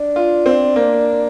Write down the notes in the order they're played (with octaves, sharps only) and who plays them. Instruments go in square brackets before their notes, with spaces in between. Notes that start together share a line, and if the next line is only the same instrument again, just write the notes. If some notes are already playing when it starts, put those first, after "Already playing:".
Already playing: [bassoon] D4
[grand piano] F4
C4
A#3